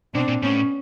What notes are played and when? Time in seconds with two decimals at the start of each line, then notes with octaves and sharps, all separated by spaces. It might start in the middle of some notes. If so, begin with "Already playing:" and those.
0.14 B2 C4 D4
0.28 A#2
0.43 A2 B3 C#4